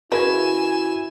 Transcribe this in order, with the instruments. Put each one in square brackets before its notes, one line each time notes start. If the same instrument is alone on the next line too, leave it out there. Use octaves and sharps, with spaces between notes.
[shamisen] C#3 A#4 B4 [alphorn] E4 [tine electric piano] F#4 G#6 [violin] G#5 E7